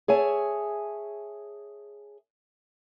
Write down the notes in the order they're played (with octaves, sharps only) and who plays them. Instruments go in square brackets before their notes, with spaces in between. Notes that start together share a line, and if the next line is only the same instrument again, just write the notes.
[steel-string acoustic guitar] G#4 C#5 E5 G#5 A5